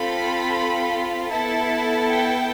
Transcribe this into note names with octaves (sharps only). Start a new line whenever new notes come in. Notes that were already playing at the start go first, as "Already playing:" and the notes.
Already playing: C4 F4 A4 B5
B3 E4 A4 A5
G5